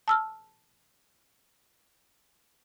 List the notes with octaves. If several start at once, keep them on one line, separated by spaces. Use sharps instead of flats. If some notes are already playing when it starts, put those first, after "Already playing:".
A5 E6 F6